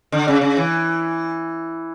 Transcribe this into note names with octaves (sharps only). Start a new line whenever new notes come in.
D3
C#3
C#3
E3